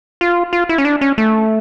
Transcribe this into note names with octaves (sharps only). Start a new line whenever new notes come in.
F4
F4
E4
C#4
D4
C#4
A3